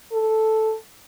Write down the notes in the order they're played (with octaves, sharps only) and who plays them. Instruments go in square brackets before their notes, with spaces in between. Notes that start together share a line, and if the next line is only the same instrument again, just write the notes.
[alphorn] A4